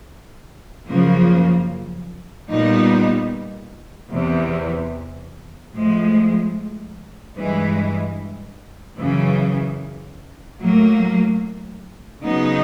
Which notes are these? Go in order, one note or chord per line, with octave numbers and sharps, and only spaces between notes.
F#2 C#3 F3 A#3
A#2 G3 B3 D#4
E2 C3 E3
A2 F3 G#3
G2 E3 G#3
F#2 C#3 E3
A2 F#3 A#3
C#3 F#3 B3 D#4